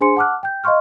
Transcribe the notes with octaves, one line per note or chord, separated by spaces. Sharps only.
D4 G#4 C5 G#5 C6 C#7
F#5 A5 D6 F6 F#6
G5 G6
D#5 F5 C6 C#6 F6